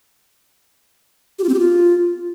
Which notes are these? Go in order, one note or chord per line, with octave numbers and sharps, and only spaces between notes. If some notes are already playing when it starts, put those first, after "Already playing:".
G4
F4
C4
G4
F4